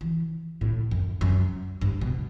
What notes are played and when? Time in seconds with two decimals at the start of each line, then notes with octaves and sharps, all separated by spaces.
0.01 E3
0.61 A2
0.91 F#2
1.21 F#2
1.81 G2
2.01 B2